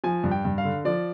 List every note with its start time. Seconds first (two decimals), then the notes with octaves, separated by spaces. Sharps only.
0.04 F3 G#5
0.24 G2
0.31 G5
0.45 G2
0.58 F5
0.64 D3
0.85 F3 D5